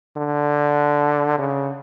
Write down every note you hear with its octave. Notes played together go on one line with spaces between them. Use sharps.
D3
C#3